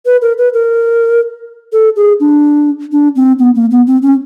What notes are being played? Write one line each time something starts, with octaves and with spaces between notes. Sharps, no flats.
B4
A#4
B4
A#4
A4
G#4
D4
D4
C4
B3
A#3
B3
C4
C#4